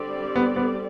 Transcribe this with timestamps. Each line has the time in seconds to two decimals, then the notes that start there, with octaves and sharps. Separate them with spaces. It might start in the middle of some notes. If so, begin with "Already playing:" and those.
Already playing: D3 G3 C4 G4 D5
0.36 B3
0.56 B3